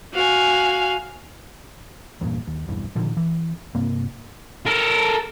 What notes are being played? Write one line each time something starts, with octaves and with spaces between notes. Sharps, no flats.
F#4 F5 G#5
E2 G2 A#2
D#2
B1 E2 G2 E3
A#2 D3 D#3 F3
E3
G2 C3 A#3 C4
A4 A#4